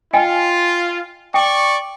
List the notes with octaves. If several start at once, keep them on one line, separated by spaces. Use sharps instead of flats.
F4 D#5 G5 G#5
D5 G5 C#6